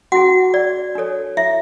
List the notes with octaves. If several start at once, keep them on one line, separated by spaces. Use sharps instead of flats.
C#4 E4 F#4 G#4 F#5
D5
D4 A4 C#5
E4 E5